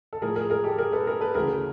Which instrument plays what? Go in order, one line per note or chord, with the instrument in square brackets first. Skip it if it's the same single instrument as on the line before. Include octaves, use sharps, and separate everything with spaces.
[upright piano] A4
A2 F3 G#4 A#4
G#4 A#4
G#4 A#4
G4 A4
G#4 A#4
A4 B4
G#4 A#4
A4 B4
D2 C#3 E3 G#4 A#4